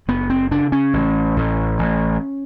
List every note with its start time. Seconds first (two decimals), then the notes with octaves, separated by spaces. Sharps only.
0.08 F#1 B3
0.30 C4
0.51 C#3 D4
0.72 C#4
0.93 A1
1.37 A1
1.79 A1